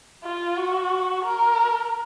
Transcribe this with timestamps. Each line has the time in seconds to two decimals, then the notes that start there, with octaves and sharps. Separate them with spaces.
0.24 F4
0.57 F#4
1.25 A#4